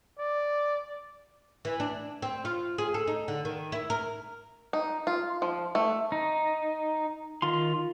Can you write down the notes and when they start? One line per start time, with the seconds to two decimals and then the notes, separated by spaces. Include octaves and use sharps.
0.19 D5
1.65 E3
1.80 D4
2.22 C4
2.45 F4
2.78 G#4
2.94 A4
3.07 D#4
3.28 D3
3.45 D#3
3.72 E4
3.90 A#4
4.73 D#4
5.07 F4
5.42 F3
5.75 A3
6.12 D#4
7.42 D#3 F4 C6